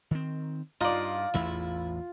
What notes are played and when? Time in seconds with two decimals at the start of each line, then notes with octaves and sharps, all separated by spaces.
0.11 D#3 C4
0.81 G2 D#4 F4 D5
1.34 A1 E2 A2 E4